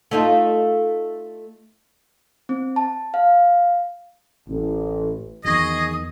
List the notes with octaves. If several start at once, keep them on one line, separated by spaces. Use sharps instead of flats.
A3 D#4 F4
C4
A5
F5
A1
E2 D#3 F#3 G#4 D#5 C#6 D#6 A#6